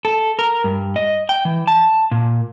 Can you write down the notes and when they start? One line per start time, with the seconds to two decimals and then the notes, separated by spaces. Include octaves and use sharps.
0.05 A4
0.39 A#4
0.64 G2
0.96 D#5
1.29 G5
1.45 E3
1.67 A5
2.11 A#2